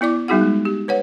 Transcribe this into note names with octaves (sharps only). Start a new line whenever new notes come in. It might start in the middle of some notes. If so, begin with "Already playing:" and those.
B3 E4 D5 D6
G3 B3 D#4 F#4 G#4 F#5
G#3
G4
B4 C#5 F#5